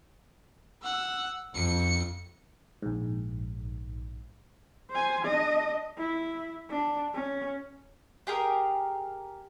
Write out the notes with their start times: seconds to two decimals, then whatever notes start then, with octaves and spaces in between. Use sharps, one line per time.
0.83 F#5 E6
1.55 F2 C#7
2.83 A#1 G#2
4.91 C5 G#5
5.25 D4 D#5
5.98 E4
6.70 D4
7.14 C#4
8.27 G4 G#4 A#4